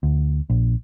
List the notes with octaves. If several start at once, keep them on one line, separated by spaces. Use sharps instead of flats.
D2
A#1